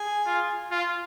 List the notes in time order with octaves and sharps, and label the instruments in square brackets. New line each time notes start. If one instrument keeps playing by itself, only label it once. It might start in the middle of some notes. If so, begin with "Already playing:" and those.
Already playing: [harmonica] G#4 G#5
[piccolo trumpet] F4
F4